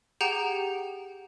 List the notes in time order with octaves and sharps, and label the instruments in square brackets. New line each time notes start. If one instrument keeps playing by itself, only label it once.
[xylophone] G4 G#4 F#5 G5 A#5 G6